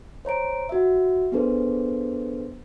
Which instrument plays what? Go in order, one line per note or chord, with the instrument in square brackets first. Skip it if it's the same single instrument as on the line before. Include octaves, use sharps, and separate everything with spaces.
[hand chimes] C5 C#5 A#5 D7
F#4 E5
B3 D4 G#4 A4 B4 C5